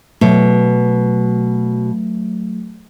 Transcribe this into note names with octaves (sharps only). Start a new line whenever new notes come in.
B2 F#3 A3